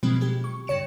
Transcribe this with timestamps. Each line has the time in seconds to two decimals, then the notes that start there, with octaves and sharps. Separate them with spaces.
0.03 B2 D#3 F3 F#3 G#3 C4
0.21 G#3 G4
0.44 C#6
0.67 G2 C#3 C#5 C#7 E7